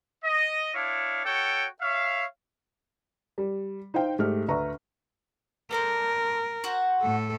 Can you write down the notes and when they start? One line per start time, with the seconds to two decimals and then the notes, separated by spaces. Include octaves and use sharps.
0.24 D#5
0.74 D4 E4 C#5 F5
1.25 F#4 A4 C#5 G5
1.81 C#5 E5 F5
3.38 G3
3.94 D#4 C5 F5 G5
4.19 G#2 A3 G4 F6
4.48 D2 B4 E5 A#5 C#6
5.71 D4 A4 A#4 C5
6.64 F#4 C5 F#5
7.02 A2 A4